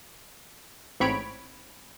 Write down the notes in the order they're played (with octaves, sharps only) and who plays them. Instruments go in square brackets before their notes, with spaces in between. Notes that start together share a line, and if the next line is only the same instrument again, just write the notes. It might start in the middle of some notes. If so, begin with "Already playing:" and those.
[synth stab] A1 G#2 C4 C#5 B5 D7